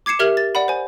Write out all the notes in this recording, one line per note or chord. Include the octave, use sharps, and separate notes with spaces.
D6 G#6 C7 C#7 E7
G4 A#4 E5 F6 G#6 F#7
A6
D5 F#5 B5
C5 G#5